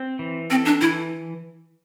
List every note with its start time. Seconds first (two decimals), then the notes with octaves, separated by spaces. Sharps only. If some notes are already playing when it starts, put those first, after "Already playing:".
Already playing: C4
0.19 E3
0.50 C4 A4
0.65 D4
0.81 E3 E4